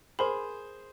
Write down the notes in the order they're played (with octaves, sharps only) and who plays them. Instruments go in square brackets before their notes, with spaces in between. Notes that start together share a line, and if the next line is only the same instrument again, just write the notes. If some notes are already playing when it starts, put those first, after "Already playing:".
[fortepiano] G#4 C5 [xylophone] A#4 B5